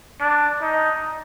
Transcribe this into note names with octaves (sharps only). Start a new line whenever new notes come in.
D4
D#4